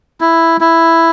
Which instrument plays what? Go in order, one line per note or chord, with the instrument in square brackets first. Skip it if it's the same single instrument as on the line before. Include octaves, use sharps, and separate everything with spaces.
[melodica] E4
E4